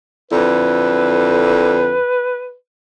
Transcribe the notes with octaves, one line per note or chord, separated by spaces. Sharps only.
F2 D3 E4 B4